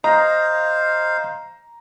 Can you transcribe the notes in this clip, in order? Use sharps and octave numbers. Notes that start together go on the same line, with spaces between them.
C5 D#5 F5 A#5